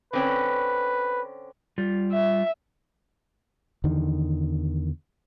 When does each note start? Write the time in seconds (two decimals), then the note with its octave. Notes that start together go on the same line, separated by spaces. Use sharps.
0.13 D3 C4 C#4 B4
1.78 G3 F4
2.12 E5
3.84 E2 D3 D#3